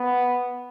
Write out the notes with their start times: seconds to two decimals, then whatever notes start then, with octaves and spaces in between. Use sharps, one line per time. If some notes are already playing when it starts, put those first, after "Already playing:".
Already playing: B3